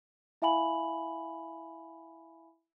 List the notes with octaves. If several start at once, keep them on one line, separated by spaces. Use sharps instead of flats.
E4 E5 F5 G#5 B5 F#7